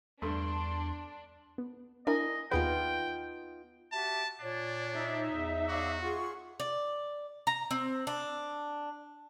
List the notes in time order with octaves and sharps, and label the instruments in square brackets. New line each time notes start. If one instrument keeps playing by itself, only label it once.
[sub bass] E2 [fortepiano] G2 A3 [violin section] D4 [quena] C6
[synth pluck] B3
[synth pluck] D4 E4 A#4 [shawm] D#5 [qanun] G#5
[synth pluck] D#2 G#4 B4 [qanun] B3 D#4 F4 [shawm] G5
[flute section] F#4 G4 E5 [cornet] A5
[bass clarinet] A#2 [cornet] D4 [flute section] C#5 D5
[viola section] D#4 E5
[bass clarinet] E2
[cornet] F#4 [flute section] C#5 F5 D6
[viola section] F4 G#4 [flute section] F#5 C6 C#6
[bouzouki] D5
A#5
C4
D4